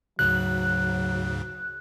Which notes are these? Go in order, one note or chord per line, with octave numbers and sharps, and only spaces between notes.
D2 G#2 C#3 F#3 F#6